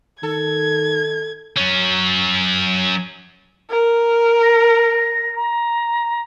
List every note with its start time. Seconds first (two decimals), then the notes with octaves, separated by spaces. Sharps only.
0.23 D#3 A4 G#6
1.57 F#3 C#4
3.70 A#4
4.43 A#6
5.36 A#5